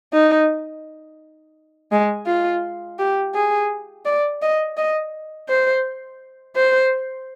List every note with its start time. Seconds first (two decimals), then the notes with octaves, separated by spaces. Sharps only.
0.13 D#4
1.92 G#3
2.27 F4
2.99 G4
3.35 G#4
4.05 D5
4.42 D#5
4.77 D#5
5.49 C5
6.56 C5